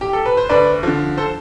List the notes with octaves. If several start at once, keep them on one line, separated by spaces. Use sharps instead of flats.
G4
A4
B4
C5
D2 B4 D5
D3 F3
A4 C5